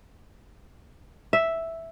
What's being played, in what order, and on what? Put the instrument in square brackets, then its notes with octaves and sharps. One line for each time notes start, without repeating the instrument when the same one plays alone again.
[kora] E5